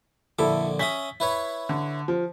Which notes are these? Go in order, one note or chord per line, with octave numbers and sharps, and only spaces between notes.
A#1 D3 E4 A4 D6
C#4 E5 D#6 B6
E4 B4 C#5
D3
F3